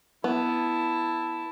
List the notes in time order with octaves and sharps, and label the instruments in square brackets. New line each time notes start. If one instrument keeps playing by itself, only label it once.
[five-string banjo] B3 [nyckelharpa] E4 A5